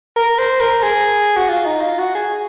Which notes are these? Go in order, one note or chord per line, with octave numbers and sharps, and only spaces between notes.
A#4
C5
A#4
G#4
F#4
F4
D#4
F4
F#4
G#4